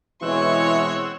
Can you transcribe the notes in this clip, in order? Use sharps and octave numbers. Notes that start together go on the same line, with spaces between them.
B2 E3 G#3 C4 C#5 F#5 C#6 E6